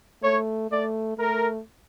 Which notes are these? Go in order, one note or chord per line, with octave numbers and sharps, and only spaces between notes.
A3 C#5
A3 D5
A3 A#4